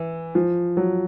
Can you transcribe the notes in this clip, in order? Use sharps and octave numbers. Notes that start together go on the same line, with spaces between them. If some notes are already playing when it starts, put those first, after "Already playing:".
Already playing: E3
F3
F#3